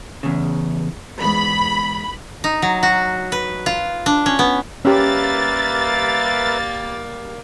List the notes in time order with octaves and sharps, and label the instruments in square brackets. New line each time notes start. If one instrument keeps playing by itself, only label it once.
[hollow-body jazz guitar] E2 C#3
[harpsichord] E2 G#2 [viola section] B5
[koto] D#4
F#3
F#4
B4
F4
D4
C#4
B3
[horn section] G3 A#3 [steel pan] C#4 G4 [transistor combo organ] A#4 B4 E5 [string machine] A6